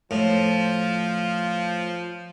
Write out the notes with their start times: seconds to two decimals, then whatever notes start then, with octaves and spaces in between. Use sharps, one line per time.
0.11 A2 F3